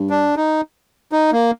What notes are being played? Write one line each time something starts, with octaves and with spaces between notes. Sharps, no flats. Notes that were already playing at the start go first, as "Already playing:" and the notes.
Already playing: G2
D4
D#4
D#4
A#3